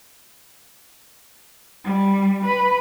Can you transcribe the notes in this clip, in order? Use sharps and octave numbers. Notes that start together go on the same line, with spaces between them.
G3
B4